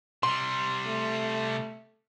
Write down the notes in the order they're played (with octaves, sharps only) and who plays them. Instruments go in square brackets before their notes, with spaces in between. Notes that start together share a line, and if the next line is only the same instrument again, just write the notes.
[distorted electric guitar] C3 G3 [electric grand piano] C6
[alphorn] A3